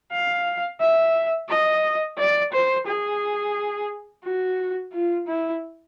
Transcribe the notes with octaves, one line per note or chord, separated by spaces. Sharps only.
F5
E5
D#5
D5
C5
G#4
F#4
F4
E4